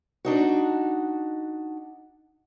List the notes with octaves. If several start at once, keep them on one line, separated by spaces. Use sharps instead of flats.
D4 D#4 F#4